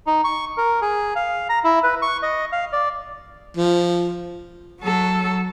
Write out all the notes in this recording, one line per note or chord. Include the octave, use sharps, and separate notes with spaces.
D#4
C#6
A#4
G#4
F5
A#5
E4
B4
C#6
D#5
F5
D5
F3
F#3 A4